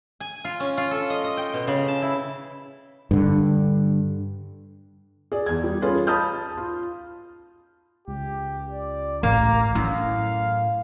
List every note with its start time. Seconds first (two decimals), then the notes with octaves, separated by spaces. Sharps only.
0.20 G#5
0.45 F4
0.60 C#4
0.78 F4
0.91 A4
1.10 D#5
1.24 D#5
1.37 G5
1.54 B2
1.67 C#3
1.88 A5
2.02 E4
3.11 G2 D3
5.32 G#4 D5
5.46 E2 G#6
5.64 G3
5.82 C#4 F4 G#4 A4 B4
6.07 A5 B5 D#6 F6 G6
6.57 F4
8.08 C#2 G4
8.71 D5
9.23 A1 A#3 A#5
9.75 F#2 A2 E4 F5